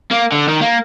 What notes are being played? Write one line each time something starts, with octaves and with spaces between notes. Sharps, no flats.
A#3
D3
D#3
A#3